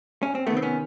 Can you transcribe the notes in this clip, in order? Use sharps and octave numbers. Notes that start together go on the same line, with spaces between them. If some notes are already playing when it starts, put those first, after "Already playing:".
C#4
C4
C3 D#3 A3 B3
C4
B3 C#4